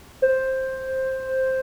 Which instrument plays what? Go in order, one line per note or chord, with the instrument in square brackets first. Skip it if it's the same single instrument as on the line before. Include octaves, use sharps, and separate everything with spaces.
[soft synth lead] C5